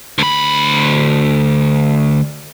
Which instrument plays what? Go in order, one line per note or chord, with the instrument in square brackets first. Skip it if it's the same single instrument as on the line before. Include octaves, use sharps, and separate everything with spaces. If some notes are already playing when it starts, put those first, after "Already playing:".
[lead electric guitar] D2 B5